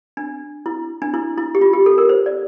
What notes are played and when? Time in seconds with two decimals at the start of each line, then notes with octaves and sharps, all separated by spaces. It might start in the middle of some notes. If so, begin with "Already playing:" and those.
0.17 D4
0.66 E4
1.02 D4
1.14 E4
1.38 E4
1.55 G4
1.61 F4
1.73 G4
1.86 A4
1.98 A#4
2.09 C5
2.26 D5